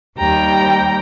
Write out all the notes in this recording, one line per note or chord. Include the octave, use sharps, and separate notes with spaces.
D#2 G3 G5 A#5